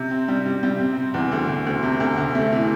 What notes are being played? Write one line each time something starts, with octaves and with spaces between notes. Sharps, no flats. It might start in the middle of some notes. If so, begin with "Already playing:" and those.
Already playing: C3
C4
G3
G3
G3
C4
C4
E2
D2
D2
D2
C3
D2
D2
A3
E3